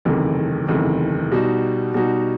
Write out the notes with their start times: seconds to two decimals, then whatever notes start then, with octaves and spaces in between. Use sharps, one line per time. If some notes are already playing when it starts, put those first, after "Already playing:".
0.05 F#1 E2 C3 D#3 A3
0.68 F#1 E2 C3 D#3 A3
1.31 B2 G3 D#4 F#4
1.94 B2 G3 D#4 F#4